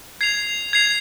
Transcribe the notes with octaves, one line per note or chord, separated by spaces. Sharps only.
G#6 C7 F7
G#6 C7 F7